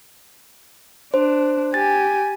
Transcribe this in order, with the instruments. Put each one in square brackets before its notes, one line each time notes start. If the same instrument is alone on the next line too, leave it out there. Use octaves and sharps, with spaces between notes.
[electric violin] D4 [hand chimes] C5
[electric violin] G4 G#5 [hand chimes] A6